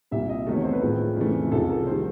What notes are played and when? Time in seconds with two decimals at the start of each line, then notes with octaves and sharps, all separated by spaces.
0.11 C2 A#2 G3 E5
0.29 D#5
0.47 E2 C3 D#3 F#3 A3
0.56 C#5
0.64 C5
0.73 B4
0.82 A2 F3 G#3
1.16 F2 C#3 E3 A3
1.52 C2 C3 F3 G#3 A4
1.69 A#4
1.87 D#3 G3 C5